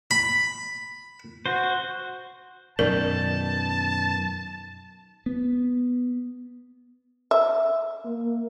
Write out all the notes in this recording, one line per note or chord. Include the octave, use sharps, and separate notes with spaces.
B5
F#4 C5
F#2 B2 D#3 A#4 D5 A5
B3
E5
A#3